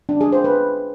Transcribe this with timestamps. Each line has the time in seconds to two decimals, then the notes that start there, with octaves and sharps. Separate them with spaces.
0.09 D4
0.21 G#4
0.33 C5
0.44 B4